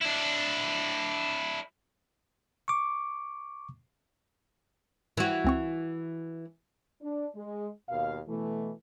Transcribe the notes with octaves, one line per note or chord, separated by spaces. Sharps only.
D4 E4
C#6 D6
E3 F#4
C#2 C4 C#6
D4
G#3
D#2 B2 A#4 F5
B2 E3 A3